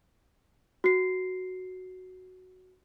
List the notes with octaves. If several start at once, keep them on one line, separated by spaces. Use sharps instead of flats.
F#4 C7